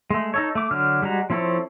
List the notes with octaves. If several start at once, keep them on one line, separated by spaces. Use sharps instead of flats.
G#3 A3
D#4 A4 C#5
A3 D6
D3 F#3 F6
G3 G#3 F#4 A#5
F3 C4 E4 A4 C#5